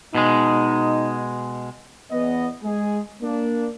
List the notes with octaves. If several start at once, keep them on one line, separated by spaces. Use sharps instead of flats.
B2 G#3 D#4
E2 B3 D#5
G#3 G#4
A#3 D4